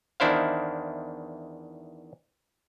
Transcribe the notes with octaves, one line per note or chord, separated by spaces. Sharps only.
E2 D#3 D4 E4 C5 F5